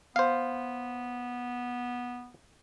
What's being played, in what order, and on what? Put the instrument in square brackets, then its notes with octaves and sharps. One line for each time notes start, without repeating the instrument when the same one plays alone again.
[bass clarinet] B3 [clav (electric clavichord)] C5 F5